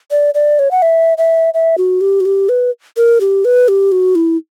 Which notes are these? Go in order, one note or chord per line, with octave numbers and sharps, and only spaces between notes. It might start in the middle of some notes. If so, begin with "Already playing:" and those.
D5
D5
C#5
F#5
E5
E5
E5
F#4
G4
F#4
G4
B4
A#4
G4
B4
G4
F#4
E4